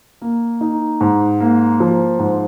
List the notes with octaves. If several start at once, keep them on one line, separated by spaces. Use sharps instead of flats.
A#3
D#4
G#2
A#3
F3
G#2